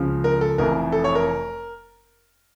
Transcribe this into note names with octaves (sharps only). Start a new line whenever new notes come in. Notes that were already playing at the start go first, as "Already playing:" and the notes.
Already playing: C#2 C#3 F3
A#4
A4
F1 F2 E3 A#4
A4
C#5
A#4